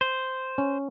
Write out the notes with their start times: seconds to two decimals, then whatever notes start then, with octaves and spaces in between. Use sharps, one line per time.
0.01 C5
0.58 C#4